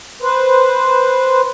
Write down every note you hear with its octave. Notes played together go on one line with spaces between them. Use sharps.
B4 C5